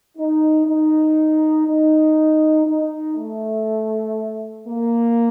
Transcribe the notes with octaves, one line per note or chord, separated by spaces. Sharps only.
D#4
D#4
D#4
D#4
A3
A#3